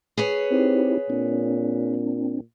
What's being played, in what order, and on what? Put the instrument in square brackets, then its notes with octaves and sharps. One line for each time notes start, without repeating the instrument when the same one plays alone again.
[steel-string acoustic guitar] G#4 B4 C#5
[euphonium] C4 [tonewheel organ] D#4 E4 G4
[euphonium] A#2 [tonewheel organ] C4 D4